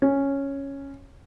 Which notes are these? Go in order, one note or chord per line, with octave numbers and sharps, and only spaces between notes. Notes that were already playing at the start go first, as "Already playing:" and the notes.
C#4